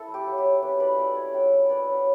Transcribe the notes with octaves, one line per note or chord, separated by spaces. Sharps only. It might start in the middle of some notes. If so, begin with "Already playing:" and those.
Already playing: E4 A4
A3
G4
F#3
G4
F#3
C#4 G4 B4
E4 B4 D5
A3 B4 D5
C#4 C#5 E5
F#3 E5 G5
E4
C#4 B4 D5
F#3